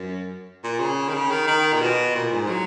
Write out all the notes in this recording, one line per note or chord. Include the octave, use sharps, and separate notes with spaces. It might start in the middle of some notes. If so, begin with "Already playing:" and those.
Already playing: F#2
A#2
C#3
D#3
C#3
D#3
D#3
A#2
B2
A#2
G#2
F#3